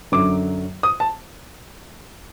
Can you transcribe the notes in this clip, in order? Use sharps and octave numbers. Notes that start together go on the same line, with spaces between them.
F#2 D3 F#3 D6
D#6
A5